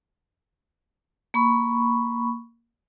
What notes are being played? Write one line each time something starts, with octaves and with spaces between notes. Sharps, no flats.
A#3 B5 C#6